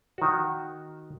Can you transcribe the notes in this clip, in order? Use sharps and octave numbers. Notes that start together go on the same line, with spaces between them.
D#3 F#4